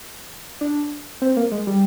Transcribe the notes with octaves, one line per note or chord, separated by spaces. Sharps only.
D4
C4
A#3
G#3
G3